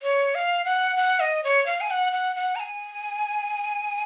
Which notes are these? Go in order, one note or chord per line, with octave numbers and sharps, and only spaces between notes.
C#5
F5
F#5
F#5
D#5
C#5
F5
G#5
F#5
F#5
F#5
A#5
G#5